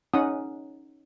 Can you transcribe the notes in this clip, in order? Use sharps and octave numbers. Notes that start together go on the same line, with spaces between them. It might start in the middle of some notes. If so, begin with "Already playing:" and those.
C#4 D#4 F#5 D#6